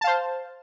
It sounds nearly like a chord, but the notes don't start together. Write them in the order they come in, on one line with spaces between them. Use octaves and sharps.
A5 F5 C5